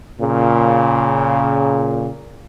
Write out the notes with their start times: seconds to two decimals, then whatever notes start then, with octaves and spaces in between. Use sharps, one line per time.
0.21 A#2 C#3